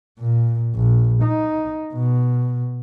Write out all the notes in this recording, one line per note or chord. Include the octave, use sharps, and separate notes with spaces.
A#2
A#1
D#4
B2